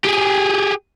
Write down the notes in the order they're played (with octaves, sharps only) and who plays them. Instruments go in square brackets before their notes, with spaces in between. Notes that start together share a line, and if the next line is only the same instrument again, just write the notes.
[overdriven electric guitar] G4 G#4